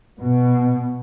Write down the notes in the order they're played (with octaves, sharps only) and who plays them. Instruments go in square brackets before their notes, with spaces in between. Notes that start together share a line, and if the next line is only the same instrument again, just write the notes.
[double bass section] B2